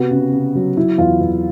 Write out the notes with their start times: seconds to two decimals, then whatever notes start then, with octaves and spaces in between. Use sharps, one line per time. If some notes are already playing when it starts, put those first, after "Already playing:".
Already playing: C3 B3 F#4
0.11 C#3
0.33 C#3
0.55 F#3
0.77 F#3 E4
0.98 E2 F4
1.21 E2